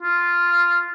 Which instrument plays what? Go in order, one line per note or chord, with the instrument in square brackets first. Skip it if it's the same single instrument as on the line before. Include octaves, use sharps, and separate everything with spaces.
[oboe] F4